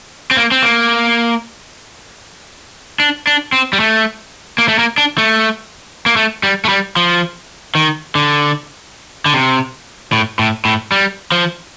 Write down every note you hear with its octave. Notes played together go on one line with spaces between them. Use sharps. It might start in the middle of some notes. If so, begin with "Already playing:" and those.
C4
A#3
C4
A#3
D4
D4
C4
G3
A3
A#3
A3
A#3
D4
A3
A#3
A3
G3
A3
G3
F3
D#3
D3
D3
C3
A2
A2
A2
G3
F3